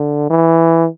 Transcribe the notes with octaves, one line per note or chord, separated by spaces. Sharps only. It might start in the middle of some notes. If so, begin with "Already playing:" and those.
Already playing: D3
E3